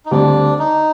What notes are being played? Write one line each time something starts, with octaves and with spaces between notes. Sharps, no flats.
D#4
D2 D3 G3 C4 D4
D#4